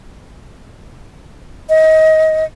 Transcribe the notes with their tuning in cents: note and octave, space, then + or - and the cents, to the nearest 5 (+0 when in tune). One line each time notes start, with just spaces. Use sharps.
D#5 +25